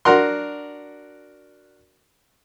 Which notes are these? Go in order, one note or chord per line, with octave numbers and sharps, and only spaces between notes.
D4 F#4 A#4 F#5 C6